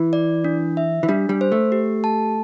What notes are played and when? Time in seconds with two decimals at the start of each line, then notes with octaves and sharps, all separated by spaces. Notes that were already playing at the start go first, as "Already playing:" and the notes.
Already playing: E3
0.13 D5
0.44 D4
0.77 E5
1.03 E3
1.08 G3 D4
1.29 G3
1.41 C5
1.52 A3
1.72 G4
2.04 A5